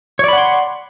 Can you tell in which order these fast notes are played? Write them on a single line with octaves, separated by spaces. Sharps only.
C#5 D5 B5 F#5 C6